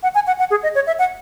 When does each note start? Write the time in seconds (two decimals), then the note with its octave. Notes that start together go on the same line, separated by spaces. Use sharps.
0.03 F#5
0.15 G#5
0.27 F#5
0.39 F#5
0.51 G#4
0.63 D#5
0.75 C#5
0.87 E5
0.99 F#5